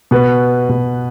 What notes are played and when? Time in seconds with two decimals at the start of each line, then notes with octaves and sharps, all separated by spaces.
0.11 B2 B4
0.69 B2